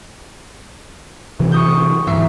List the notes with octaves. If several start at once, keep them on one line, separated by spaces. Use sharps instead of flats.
C3 E3 F#3
C#6 D#6 G6
D1 G#2 E3 E5 C7